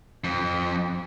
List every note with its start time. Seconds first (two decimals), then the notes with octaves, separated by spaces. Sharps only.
0.24 F2